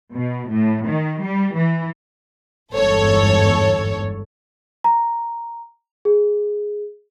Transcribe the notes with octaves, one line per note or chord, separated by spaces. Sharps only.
B2
A2
D#3
G3
E3
G1 E2 G#2 A4 C#5
A#5
G#4